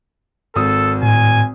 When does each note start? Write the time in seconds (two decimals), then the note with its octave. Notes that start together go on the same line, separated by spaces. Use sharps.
0.56 G#1 A4 D#6
1.03 A2 G#5